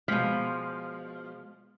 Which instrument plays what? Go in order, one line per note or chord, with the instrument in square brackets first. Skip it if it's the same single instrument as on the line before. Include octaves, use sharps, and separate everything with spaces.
[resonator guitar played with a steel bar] B2 F3 [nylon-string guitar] G#3 F5